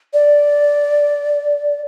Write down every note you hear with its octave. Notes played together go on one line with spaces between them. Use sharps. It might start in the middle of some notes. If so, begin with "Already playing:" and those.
D5